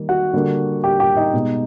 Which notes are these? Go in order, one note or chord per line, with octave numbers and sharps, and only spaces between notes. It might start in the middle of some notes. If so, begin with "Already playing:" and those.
Already playing: D#3 G3 A#3
F#4 F#5
D3 G3 A#3
G4 G5
G4 G5
D#4 D#5
B2 G#3